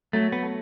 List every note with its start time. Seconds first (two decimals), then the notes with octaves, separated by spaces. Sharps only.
0.13 F#3 A3
0.32 B3
0.42 A3